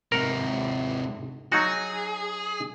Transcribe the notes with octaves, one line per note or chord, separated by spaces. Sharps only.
G#2 C3 A#4 F#5
F#3 D#4 F#4 G#4